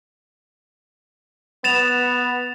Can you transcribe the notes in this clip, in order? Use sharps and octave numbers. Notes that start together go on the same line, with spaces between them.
B3 A6 E7 F7